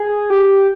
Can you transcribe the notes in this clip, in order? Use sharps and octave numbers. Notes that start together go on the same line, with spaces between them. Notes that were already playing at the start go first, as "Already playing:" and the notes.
Already playing: G#4
G4